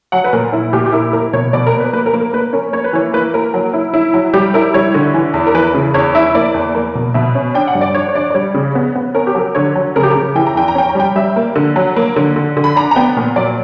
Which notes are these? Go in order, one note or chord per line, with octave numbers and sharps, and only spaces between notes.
F#3 F#5
B4
A#2 A#4
E4
A#2 G4
G4
E4 A#4
A#3 A#4
B2 C#5
B2 D5
A#4
A#3
B4
A#3 B4
A#4
A#3
A#4
A#3 B4
C#4 A#4
A#3 C#5
B4
E3 C#5
A#3 B4
A#3 A#4
F#3
E4
E4
F#3
G3 G4
E4 A#4
G3 C#5
D3
E3
E2
A#4
E3 B4
C#3
E2 C#5
E4 E5
A#3 D5
E2
A#3
B2
B2 E5
C#4
D4 G5
F#5
G2
D5
D4 C#5
C#5
D4 D5
D5
G3 C#5
C#3
B3
B3
C#4 A#4
G4
F#3 A#4
D3 C#5
F#3
C#3 A#4
G4
A#4
C#3
E3 G5
A#5
E2 G5
A#5
C#4 G5
A#5
G3 G5
G3 E5
A#3
D3
F#3
A#3
D3
D3
D3
B5
D4 A#5
A#5
B3 G5
A#2
F#3 D5